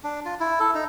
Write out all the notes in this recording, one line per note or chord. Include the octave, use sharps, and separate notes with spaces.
D4
F4
E4
A4
D#4